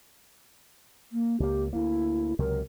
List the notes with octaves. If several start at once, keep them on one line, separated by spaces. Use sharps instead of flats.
A#3
C#2 A#3 G4
D2 A#3 E4
C#2 C3 F#3 A#4